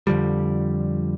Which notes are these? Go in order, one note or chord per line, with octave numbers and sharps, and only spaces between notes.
F2 D3 F3 G3